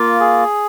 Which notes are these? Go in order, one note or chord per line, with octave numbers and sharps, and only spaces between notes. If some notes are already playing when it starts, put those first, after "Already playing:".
Already playing: A#3 F4
G#4